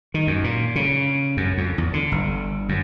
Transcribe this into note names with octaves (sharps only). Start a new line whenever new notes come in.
D#3
F#2
A#2
C#3
F#2
F2
E2
D3
G1
F#2